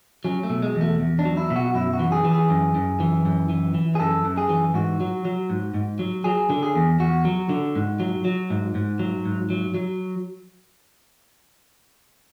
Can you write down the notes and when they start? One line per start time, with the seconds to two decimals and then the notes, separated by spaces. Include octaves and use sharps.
0.25 F#3 C#4
0.43 A3
0.50 B2
0.62 G#3
0.75 E2
0.81 A3
1.00 E2
1.19 D4
1.25 F#3
1.37 E4
1.50 B2
1.56 F#4
1.74 F#2 E4
1.93 F#4
1.99 E3
2.12 G#4
2.25 E3
2.32 G#4
2.50 F#2
2.75 F#2
3.00 E3
3.25 F#2
3.49 E3
3.74 E3
3.95 G#4
4.00 F#2 A4
4.25 F#2
4.38 G#4
4.49 E3
4.74 G#2 F#4
5.00 F#3
5.25 F#3
5.50 G#2
5.74 G#2
5.99 F#3
6.24 F#3 G#4
6.50 D3
6.63 G#4
6.76 E2
7.00 E2 F#4
7.25 F#3
7.49 D3
7.76 G#2
8.00 F#3
8.25 F#3
8.50 G#2
8.75 G#2
8.99 F#3
9.26 G#2
9.50 F#3
9.74 F#3